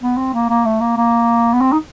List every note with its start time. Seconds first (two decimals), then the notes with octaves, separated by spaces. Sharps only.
0.01 B3
0.17 C4
0.34 A#3
0.50 A#3
0.65 A3
0.81 A#3
0.97 A#3
1.53 B3
1.61 C4
1.72 D#4